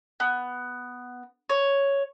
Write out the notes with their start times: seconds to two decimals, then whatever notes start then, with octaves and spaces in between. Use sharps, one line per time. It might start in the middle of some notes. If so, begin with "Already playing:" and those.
0.20 B3
1.50 C#5